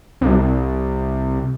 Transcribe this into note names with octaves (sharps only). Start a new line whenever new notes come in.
C2